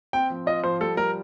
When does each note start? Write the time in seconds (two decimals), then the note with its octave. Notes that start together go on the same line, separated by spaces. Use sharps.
0.13 C4 G5
0.30 F3
0.46 F4 D#5
0.64 F3 C5
0.81 G3 A4
0.97 G3 A#4